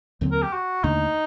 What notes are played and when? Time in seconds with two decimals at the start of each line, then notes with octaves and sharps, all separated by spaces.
0.21 D#2 D3 F#3 C4
0.32 A#4
0.42 G4
0.53 F#4
0.84 D#2 D3 A3 D4 D#4